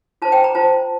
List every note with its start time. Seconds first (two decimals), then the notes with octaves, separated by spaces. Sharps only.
0.22 F4 C5 A5
0.32 G5
0.44 A#5
0.55 F4 C5 A5